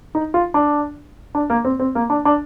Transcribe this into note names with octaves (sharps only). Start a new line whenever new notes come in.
D#4
F4
D4
D4
A#3
C4
C4
A#3
D4
D4